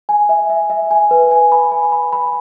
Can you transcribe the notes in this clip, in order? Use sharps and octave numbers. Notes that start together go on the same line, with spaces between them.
G#5
E5
E5
E5
G#5
B4
G#5
B5
G#5
B5
B5